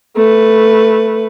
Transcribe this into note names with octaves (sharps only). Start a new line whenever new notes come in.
A3 B4